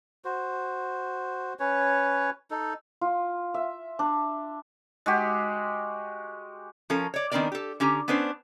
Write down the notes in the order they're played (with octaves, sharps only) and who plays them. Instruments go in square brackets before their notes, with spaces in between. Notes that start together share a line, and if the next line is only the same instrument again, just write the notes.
[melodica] F#4 C5
C#4 B4 C#5
D#4 A4
[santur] F4
E5
D4
[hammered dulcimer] G#3 F#4 G4
[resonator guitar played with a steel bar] F3 C#4 A4 A#4
C#5 D5
D#3 B3 C4 D4 A#4 D5
G4 A4
D3 C#4 G4 A#5
B3 C#4 D4 B4 C5